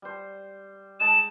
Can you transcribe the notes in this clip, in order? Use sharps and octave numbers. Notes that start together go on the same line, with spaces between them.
G3 C5
G#3 A5 E7